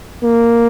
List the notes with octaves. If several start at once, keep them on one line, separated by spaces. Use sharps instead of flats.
A#3